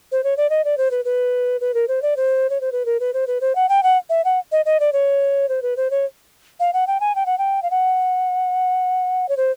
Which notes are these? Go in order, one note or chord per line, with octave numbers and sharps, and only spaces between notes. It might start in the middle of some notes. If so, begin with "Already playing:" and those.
C5
C#5
D5
D#5
D5
C5
B4
B4
B4
A#4
C5
D5
C5
C#5
C5
B4
A#4
B4
C5
B4
C5
F#5
G5
F#5
E5
F#5
D#5
D#5
D5
C#5
C5
B4
C5
C#5
F5
F#5
G5
G#5
G5
F#5
G5
F5
F#5
C#5
C5